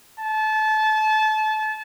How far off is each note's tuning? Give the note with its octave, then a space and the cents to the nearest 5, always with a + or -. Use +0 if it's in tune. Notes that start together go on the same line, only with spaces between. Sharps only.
A5 -25